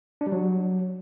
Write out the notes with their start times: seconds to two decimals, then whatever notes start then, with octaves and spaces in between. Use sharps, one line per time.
0.21 D4
0.27 G3
0.32 F#3